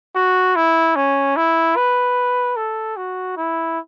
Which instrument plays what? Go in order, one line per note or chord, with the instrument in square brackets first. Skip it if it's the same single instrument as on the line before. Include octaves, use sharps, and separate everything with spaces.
[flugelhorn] F#4
E4
C#4
E4
B4
A4
F#4
E4